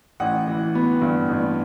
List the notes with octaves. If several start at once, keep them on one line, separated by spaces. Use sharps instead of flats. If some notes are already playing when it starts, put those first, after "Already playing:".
A1 F#5
E3
B3
G2
A1